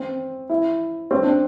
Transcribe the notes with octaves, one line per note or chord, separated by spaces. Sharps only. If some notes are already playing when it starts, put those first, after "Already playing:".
Already playing: C4
E4
C4
D4